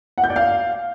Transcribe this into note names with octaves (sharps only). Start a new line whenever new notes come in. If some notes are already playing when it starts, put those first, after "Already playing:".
F#5
G6
D5
F5